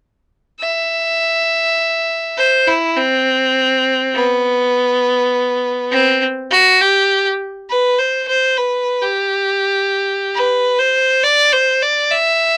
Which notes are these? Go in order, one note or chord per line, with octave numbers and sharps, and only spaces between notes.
E5
C5
E4
C4
B3
C4
F#4
G4
B4
C5
C5
B4
G4
B4
C5
D5
C5
D5
E5